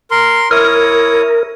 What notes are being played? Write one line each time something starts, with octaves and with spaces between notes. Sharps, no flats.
A#4 C6
E4 A#4 C#5 D#6